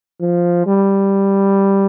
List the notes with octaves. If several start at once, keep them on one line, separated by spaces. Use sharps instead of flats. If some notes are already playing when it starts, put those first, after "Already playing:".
F3
G3